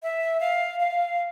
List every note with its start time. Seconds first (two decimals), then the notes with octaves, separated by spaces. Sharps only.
0.03 E5
0.40 F5
0.80 F5